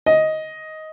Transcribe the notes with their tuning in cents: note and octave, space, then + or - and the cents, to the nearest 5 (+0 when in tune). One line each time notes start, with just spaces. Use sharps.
D#5 +10